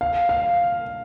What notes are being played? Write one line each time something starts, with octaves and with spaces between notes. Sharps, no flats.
F5
F5